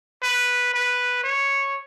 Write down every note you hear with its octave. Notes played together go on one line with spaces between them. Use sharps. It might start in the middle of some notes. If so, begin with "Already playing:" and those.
B4
B4
C#5